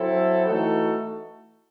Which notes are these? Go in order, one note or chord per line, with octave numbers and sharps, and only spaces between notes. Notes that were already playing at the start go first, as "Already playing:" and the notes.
Already playing: F#3 C4 E4 A4
E3 A3 D#4 F#4 A4